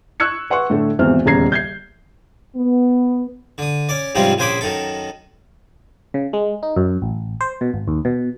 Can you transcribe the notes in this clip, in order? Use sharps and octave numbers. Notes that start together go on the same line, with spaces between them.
C#6 E6 F#6 G#6 C#7
B4 F#5 C6 C#6
A2 D3 A3 A4
G#1 E2 C3 E3 C5 F6
D#1 E2 C#3 A#5 G#6 C7
G6 G#6 C7
B3
D3 D#6
C#4 D5
G#2 C3 F3 G3 C4 C#4
A#1 C#3 C5 G#5 B5 D6
F#2 D#3 A4
C#3
G#3
D#4
F#2
A1
C5
B2
G#1
D#2
B2